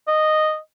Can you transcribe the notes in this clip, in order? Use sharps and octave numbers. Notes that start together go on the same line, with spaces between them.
D#5